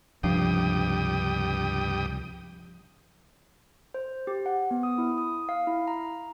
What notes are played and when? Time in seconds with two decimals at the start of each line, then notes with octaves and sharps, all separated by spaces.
0.23 C#2 G2 C3 F3 D4 G5 D#6 C7
3.94 C5
4.27 G4
4.46 F#5
4.71 B3
4.83 D#6
4.98 E4
5.18 D#6
5.49 F5
5.67 E4
5.88 A#5